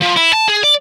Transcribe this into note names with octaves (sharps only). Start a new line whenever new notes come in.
F3
E4
A5
G#4
D5